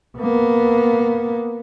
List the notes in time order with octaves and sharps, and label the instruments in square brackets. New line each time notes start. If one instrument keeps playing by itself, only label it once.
[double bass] A#3 B3